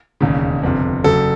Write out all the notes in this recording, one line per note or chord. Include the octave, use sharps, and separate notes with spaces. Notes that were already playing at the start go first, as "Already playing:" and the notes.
E1 D#2 C#3
G1 F2 C3
F#1 F#2 C#3 F#3 A4